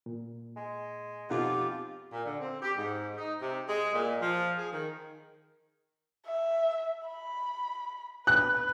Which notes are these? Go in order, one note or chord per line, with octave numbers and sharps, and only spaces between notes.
A#2
G#3
F2 B2 D#4 F4 G4 F#5
A#2
D3
C4
G4
G#2
D#4
C3
G#3
A#2
F3
G#4
D#3
E5
B5
B4 F#6